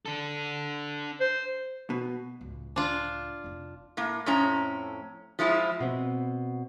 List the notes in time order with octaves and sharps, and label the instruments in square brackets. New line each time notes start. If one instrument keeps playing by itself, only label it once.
[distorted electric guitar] D4 A4
[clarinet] C5
[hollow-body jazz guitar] B2
[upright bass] C#2 A2
[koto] D4 F4
[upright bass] F1 D#4
[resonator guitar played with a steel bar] A2 A#3
F2 A2 C#4 A#5
F3 G#3 E4 F4
[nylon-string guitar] B2 C4